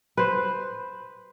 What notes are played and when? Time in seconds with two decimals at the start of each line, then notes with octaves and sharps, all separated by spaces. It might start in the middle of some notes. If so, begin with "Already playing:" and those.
0.17 B4 C5